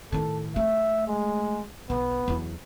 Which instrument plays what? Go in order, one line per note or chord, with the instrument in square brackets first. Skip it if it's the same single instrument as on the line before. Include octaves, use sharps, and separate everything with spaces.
[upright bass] A2 D#3 [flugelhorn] A4
[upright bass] A3 [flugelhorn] E5
[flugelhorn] G#3
[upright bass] B1 [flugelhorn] B3
[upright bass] E2 F#3